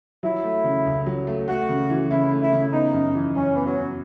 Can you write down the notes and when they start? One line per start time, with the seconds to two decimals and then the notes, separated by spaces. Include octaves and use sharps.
0.23 F#3 E4
0.43 A3
0.64 C#3
0.86 C#2
1.06 F#3
1.27 A3
1.48 A3 F#4
1.69 C#3
1.90 E3
2.10 C#3 E4
2.31 A3
2.42 E4
2.53 C#3
2.72 B3 D#4
2.93 F#2
3.15 E3
3.35 F#2 C#4
3.54 E3 B3
3.66 F#3
3.77 F#2